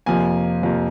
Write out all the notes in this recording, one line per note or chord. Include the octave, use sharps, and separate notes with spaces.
F2 C3 F3 A#3 G#5
F2 C3 F3 A#3